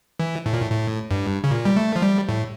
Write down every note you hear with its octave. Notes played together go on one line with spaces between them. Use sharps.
E3
A2
A#2
A2
A2
G2
C#3
A#2
G3
A3
F3
G3
A2